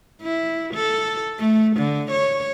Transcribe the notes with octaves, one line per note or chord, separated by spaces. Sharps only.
E4
A4
A3
D3
C#5